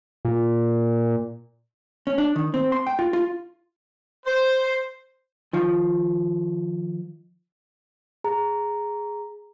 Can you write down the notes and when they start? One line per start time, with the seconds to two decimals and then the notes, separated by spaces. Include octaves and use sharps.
0.25 A#2
2.07 C#4
2.18 D4
2.36 D#3
2.54 C4
2.72 C6
2.87 G5
2.99 F4
3.13 F4
4.26 C5
5.53 D#3 F3
8.24 G#4 A#5